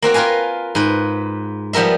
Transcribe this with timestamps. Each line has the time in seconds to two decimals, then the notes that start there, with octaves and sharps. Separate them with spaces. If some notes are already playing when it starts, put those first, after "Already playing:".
0.02 A#3 C4 F#4 A#5
0.14 F4 A#4 B4 F5 G#5
0.75 G#2 B4
1.73 F3 G3 B3 A#4 E5